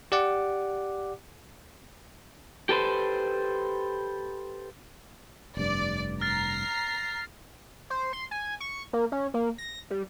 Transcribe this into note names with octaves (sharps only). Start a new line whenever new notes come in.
G4 D5 F#5 D6
G4 A4 B4 C5
F1 G2 D5
A#5 F6 A6 C7
C5
C6
G#5
C#6
A#3
C#4
A#3
A#6
G3